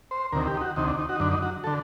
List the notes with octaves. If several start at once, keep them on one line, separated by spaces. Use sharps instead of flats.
C5
D2 C3 D#3 A#4
G4
D#4
F#4
D2 C3 D#3 D#4
D4
D#4
F#4
D#4
F#2 D3 D4
D#4
F#4
D3 A4